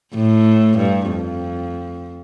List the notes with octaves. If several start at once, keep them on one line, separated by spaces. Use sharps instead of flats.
A2
G2
F2